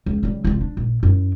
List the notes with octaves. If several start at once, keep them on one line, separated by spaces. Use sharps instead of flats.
C#2
C#3 G3
C2 F4
D4
A#1
F#2 E4